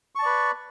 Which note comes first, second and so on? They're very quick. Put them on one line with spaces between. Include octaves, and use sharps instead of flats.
C#6 A5 D5 B4